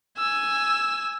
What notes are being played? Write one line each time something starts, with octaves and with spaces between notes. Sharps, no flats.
G#5 E6